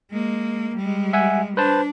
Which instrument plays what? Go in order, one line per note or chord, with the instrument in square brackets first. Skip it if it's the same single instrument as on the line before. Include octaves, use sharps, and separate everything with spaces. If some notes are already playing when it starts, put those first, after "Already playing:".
[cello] G#3 A#3
G3 G#3
[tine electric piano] E5 F#5 G#5
[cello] D4 [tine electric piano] B4 C5 A5